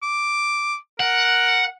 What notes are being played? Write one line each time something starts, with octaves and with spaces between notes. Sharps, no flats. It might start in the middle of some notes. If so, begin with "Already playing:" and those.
D6
A#4 F#5